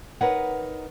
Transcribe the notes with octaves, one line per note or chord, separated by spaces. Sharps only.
D#4 A#4 B4 C#5 F#5